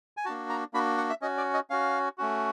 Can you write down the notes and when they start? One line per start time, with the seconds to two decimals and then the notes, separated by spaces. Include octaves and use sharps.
0.17 G#5
0.25 A#3 D4 F#4 A5
0.49 A#5
0.73 A#3 D4 F#4 B5
0.98 F#5
1.10 E5
1.22 C#4 F#4 D#5
1.38 D5
1.54 D#5
1.70 C#4 F#4 F5
2.18 A3 C#4 F#4